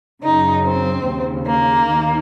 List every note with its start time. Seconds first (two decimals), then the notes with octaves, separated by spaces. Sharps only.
0.23 F#2 C#3 D#4
0.64 C4
1.04 D#2 C#3
1.46 A#3
1.87 D#2 D#3